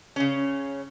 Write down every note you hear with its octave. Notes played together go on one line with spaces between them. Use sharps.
C#3 C#4